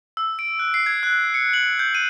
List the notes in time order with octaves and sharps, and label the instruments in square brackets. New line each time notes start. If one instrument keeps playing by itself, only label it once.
[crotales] E6
D7
F#6
C7
G#6
F#6
C#7
F#7
G6
D#7